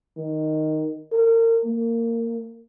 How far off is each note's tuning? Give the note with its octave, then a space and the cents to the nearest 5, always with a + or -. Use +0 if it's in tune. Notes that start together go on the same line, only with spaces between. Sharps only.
D#3 -5
A#4 -35
A#3 -20